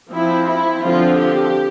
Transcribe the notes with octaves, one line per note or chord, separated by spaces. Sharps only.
F3 C4 E4
E4
D3 F3 C4 F4
G4